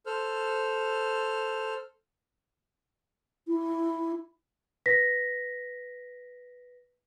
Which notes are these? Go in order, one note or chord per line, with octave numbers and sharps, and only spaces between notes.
A4 C5 F6
E4
B4 A#6 B6